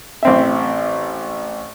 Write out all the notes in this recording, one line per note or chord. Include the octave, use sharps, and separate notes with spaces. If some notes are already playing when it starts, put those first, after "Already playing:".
A1 C4 E5